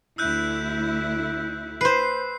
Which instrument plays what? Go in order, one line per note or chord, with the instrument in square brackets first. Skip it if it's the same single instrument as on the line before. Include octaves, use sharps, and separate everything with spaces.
[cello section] D2 E4 [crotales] E6 F#6 G6
[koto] B4 C5 [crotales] C7